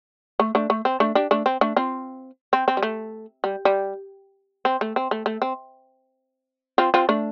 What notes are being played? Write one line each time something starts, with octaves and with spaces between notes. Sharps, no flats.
A3
A3 D4
A3
C4
A3 D4
D4 G4
A3 D4
C4
A3 D4
C4 F4
C4
C4
G3
A3
G3
G3
C4
A3
C4
A3
A3
C4
C4 F4
C4 F4
A3 D4